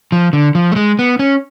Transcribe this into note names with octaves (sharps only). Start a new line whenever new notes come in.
F3
D3
F3
A3
G#3
B3
C#4